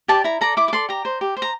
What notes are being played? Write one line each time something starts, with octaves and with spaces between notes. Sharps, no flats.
G4 D5 A5
E4 A#5
A4 D5 A#5
E4 D6
D6
A4 D5 C6
G4 A#5
C5
G4
C5
A#5